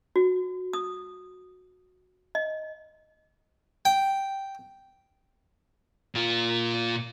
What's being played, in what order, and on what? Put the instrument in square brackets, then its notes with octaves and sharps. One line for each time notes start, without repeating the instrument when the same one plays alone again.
[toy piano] F#4
D#6
D#5
[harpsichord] G5
[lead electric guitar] A#2 F4